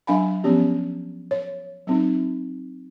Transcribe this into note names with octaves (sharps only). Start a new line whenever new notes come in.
F#3 D4 F5 G#5 B5
F3 B3 C#4 G4
C#5
F#3 C4 D#4